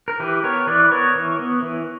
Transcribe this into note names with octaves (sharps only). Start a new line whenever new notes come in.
A#4
E3 G4 B4
B3 A#4 C#5
E3 B4 D5
B3 A#4 C#5
E3
B3
E3